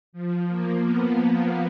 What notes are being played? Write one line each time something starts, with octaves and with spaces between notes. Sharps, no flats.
F3
A#3
B3